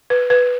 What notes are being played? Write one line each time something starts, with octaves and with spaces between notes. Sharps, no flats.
B4
B4